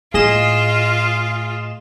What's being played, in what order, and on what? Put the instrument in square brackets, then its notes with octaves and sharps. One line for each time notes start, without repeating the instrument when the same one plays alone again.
[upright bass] A2 [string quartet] F4 [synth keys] G#4 D#5 E7